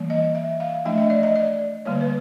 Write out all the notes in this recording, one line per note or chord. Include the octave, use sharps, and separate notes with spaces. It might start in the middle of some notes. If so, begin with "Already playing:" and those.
Already playing: E3 G3 A#3
D#5
E5
F5
F3 A3 D4 E5
D#5
D5
D#5
D5
D3 G3 A#3 C#5
B4